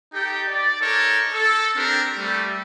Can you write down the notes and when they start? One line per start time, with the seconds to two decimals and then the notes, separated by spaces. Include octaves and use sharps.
0.14 D#4 G4 A4 G5
0.48 D5
0.81 D#4 A4 A#4 C#5
1.32 A4
1.76 C4 D4 G4 A#4
2.17 G3 A3